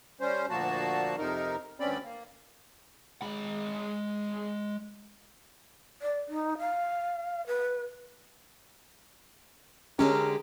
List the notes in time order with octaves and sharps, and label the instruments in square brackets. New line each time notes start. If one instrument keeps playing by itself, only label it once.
[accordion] G3 C#4 C5
D2 A#2 F3 A#3 F#4 A5
F2 C3 D#4 A#4
D2 G2 C4 C#4 D5 B5
A#3
[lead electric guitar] G#3 B5
[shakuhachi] D5
D#4
F5
B4
[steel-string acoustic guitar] D3 G#3 G4 [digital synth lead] C#4 [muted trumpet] A#4